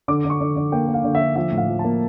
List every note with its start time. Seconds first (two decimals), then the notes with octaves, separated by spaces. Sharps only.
0.08 D3 D6
0.25 D3
0.30 C#6
0.41 D3
0.56 D3
0.72 A#3 G5
0.88 A#3
0.94 F5
1.04 D3
1.15 E5
1.21 D3
1.36 F3 E5
1.52 A2
1.58 F5
1.68 F3
1.79 A5
1.84 A#3